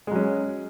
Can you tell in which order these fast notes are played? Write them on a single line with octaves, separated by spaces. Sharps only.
G#3 F#3 C#4